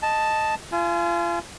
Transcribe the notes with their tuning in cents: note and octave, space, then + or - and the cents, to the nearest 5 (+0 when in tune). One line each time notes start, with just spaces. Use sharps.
D#5 +0 A5 +0
F4 -30 G#5 +25